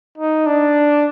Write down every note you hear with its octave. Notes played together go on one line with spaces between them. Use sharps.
D#4
D4